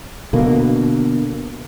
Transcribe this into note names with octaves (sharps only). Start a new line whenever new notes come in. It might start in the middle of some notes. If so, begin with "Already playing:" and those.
B2 D3 A#3